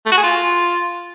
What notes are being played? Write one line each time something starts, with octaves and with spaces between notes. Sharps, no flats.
A3
F#4
G#4
F4